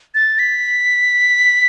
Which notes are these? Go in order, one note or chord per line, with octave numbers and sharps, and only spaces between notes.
A6
B6